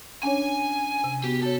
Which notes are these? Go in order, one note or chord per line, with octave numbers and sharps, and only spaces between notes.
C#4 D4 C#5 G#5
C3
C3 B3 F#4 G4
F#4 A4 C#5